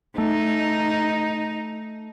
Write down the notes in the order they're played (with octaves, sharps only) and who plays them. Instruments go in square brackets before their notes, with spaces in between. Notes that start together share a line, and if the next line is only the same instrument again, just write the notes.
[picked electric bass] A3 [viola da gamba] D#4